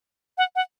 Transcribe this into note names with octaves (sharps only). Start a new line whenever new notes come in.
F#5
F#5